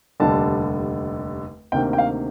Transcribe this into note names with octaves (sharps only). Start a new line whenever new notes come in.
F1 D#2 D3 G3 A5
D2 C3 D#3 A#3 G5
G5
F5